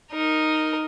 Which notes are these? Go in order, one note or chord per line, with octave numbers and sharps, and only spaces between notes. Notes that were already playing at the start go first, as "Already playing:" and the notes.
D#4 A#4